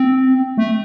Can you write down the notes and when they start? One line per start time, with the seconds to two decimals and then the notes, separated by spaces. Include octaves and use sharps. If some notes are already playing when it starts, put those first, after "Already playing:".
Already playing: C4
0.58 A3